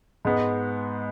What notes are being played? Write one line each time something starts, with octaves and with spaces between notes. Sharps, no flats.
G#2 G#3 B3